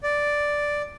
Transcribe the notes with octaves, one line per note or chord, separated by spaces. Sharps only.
D5